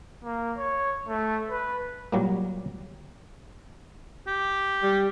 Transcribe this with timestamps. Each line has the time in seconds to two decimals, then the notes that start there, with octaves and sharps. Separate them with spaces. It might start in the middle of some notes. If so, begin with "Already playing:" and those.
0.24 A#3
0.58 C#5
1.08 A3
1.50 B4
2.12 A#2 F#3 G3 A#3
4.27 G4
4.83 G3